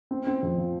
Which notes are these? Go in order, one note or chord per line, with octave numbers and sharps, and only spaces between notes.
C4
C4
F2
F3